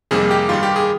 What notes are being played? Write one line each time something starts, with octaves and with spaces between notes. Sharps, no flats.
F2 C3 D#3 G3 A#3 G#4
G4
G2 D#3 G3 F4
G4
G#4